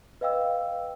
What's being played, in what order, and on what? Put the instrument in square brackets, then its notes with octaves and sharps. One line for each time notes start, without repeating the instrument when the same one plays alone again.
[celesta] B4 D#5 F5 G5 E6